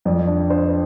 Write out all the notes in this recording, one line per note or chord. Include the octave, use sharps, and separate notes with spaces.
F2 D5
D4
D4 C5